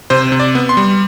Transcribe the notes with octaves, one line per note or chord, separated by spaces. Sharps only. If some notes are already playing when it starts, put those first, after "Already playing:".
C3 C5
C3
D5
B3
C6
G3